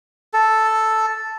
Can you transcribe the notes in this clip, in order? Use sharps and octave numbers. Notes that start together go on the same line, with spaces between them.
A4